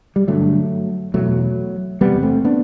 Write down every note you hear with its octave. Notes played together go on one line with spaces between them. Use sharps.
G3
G2 D3 F#3 A3
E2 B2 F#3 A3
E2 C3 G3 B3
A3 C4
B3 D4